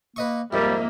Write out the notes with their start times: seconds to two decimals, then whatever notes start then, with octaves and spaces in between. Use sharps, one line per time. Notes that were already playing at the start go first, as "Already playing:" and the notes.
0.16 A#3 B4 D#5 C#6
0.53 F2 G#2 G3 A#3 E5